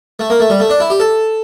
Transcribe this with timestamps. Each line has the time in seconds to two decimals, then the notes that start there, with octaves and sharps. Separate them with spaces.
0.19 A3
0.30 A#3
0.40 A3
0.50 G3
0.60 A3
0.70 D4
0.80 E4
0.90 G4
1.00 A4